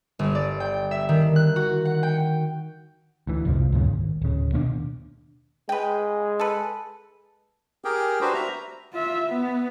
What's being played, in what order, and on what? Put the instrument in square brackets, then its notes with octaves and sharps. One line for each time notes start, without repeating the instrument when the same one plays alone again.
[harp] G1
D5
G5
E5
D#3
F#6
F#4
F#5
G5
[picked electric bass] D2 E3
C2 F2 G#2 F3
D2 G2 A#2 C#3
G#1
D1 C#3
D#2 B2 C#4 D4
[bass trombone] G#3 [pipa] B4 G5
[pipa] A4 B4
[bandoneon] G4 G#4 A#4 G5
D4 F#4 G4 B4 C5
E5 A#5
[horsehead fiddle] F4 E5
B3